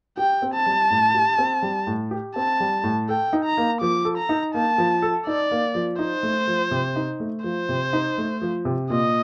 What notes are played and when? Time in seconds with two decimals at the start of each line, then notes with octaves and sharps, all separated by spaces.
0.17 G4 G5
0.42 C4
0.54 A5
0.66 G3
0.91 A2
1.14 G4
1.38 C4
1.63 G3
1.87 A2
2.11 G4
2.35 C4 A5
2.60 G3
2.84 A2
3.09 A4 G5
3.33 D#4
3.45 A#5
3.57 A#3
3.81 F3 D6
4.05 A4
4.17 A#5
4.29 D#4
4.54 A#3 A5
4.78 F3
5.02 A4
5.27 D#4 D5
5.51 A#3
5.75 F3
5.99 D#4 C5
6.23 A3
6.48 F3
6.71 C3
6.96 D#4
7.20 A3
7.44 F3 C5
7.69 C3
7.93 D#4
8.18 A3
8.42 F3
8.65 C3
8.90 A#2 D#5